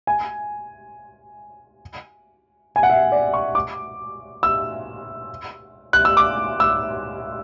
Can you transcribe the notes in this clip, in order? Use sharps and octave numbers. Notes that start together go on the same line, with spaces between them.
G#5
G#5
F#5
E5
D5
C#6
D6
E6
F#6
E6
D6
E6